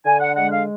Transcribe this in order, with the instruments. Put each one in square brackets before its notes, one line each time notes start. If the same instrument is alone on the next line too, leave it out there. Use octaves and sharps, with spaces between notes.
[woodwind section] D3 G#5
F#5
G#3 F#5
F5